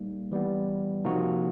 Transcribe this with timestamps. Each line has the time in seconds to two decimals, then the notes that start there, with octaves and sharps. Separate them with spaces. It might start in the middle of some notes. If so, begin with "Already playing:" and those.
Already playing: G3 A#3 D#4
0.32 E3 G3 B3
1.04 C3 F3 A#3 D#4 F#4